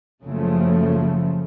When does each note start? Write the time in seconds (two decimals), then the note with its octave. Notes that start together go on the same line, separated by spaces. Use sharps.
0.23 F#1 C#3 F3 A3